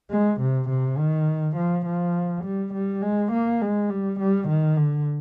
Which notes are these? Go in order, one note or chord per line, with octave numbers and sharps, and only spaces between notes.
G#3
C3
C3
D#3
F3
F3
G3
G3
G#3
A#3
G#3
G3
G3
D#3
D3